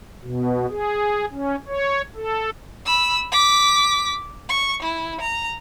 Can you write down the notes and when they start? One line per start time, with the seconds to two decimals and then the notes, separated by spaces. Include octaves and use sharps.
0.23 B2
0.69 G#4
1.31 C#4
1.68 C#5
2.15 A4
2.86 B5 E6
3.32 D6 B6
4.49 C#6
4.82 E4
5.21 A#5